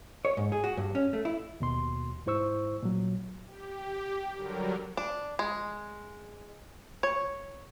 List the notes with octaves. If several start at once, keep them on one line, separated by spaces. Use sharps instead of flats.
C#5
G#2
G#4
F#4
G2
C#4
A3
E4
D#2 B2 C6
G#2 E4 C5 C#6 E6
A#2 F#3
G4
D3 F#3 G3 A#4
D4
G#3
C#5